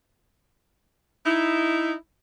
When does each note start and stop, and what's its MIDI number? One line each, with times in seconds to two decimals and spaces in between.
1.26 1.92 63
1.26 1.92 64